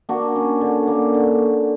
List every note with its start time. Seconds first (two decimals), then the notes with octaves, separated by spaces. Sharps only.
0.09 A#3 D4 F#4
0.35 C#4
0.61 D3
0.88 A#3
1.14 D3